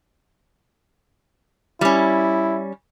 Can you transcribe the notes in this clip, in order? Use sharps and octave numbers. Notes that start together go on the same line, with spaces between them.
G3 C#4 E4